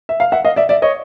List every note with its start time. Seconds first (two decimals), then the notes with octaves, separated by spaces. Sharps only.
0.09 E5
0.20 F5
0.32 E5 F#5
0.45 D#5 F5
0.56 D5 E5
0.69 D5 E5
0.82 C#5 D#5